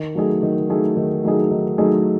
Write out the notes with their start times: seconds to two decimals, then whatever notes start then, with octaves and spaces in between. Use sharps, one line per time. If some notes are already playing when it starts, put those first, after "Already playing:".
Already playing: D#3
0.15 F#3 A3 D#4 G#4
0.43 D#3
0.70 F#3 A3 D#4 G#4
0.97 D#3
1.24 F#3 A3 D#4 G#4
1.51 D#3
1.78 F#3 A3 D#4 G#4